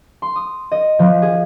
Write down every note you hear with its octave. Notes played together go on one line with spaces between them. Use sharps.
C6
D#6
D#5
F3
G#4